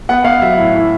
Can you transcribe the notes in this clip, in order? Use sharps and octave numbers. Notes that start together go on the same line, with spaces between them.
B3 F#5
B3 F5
F#3 E5
A2
E3